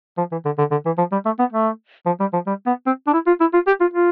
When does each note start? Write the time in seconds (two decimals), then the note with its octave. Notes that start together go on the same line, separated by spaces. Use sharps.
0.18 F3
0.32 E3
0.45 D3
0.58 D3
0.71 D3
0.85 E3
0.98 F3
1.12 G3
1.25 A3
1.39 B3
1.52 A3
2.06 F3
2.20 G3
2.33 F3
2.47 G3
2.66 B3
2.86 C4
3.07 D4
3.13 E4
3.27 F4
3.40 E4
3.53 F4
3.67 G4
3.81 F4
3.94 F4